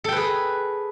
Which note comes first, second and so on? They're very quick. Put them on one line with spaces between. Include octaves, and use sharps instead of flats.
A4 G5 B4 G#4